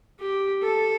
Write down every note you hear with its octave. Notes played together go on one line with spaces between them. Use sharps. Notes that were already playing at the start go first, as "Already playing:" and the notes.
G4
A4